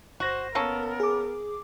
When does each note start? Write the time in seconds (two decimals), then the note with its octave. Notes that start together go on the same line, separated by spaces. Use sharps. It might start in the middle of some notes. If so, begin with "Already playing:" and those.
0.20 G1 F#4 C5 A#6
0.55 A#3 B3 C#4 A4 A#4
1.00 G#4 D6